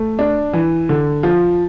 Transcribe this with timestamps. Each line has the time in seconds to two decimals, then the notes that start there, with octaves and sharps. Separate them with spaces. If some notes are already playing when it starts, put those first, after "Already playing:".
Already playing: A3
0.19 D4
0.53 E3
0.89 D3
1.23 F3